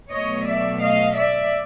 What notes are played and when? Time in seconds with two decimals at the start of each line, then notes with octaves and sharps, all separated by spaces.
0.11 B2 F#3 A3 C#5 D#5
0.46 D5 E5
0.81 D#5 F5
1.16 D5 E5